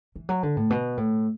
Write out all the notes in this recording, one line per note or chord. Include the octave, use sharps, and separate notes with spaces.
E3
F#3
D3
A2
B2
A2